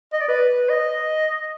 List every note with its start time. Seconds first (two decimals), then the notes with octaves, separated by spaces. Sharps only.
0.13 D#5
0.20 D5
0.28 B4
0.69 D#5